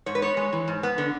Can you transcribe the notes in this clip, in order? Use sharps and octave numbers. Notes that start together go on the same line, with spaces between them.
G#2 C#5
B4
B3 C#5
G#3
E3
G#2
B3
D3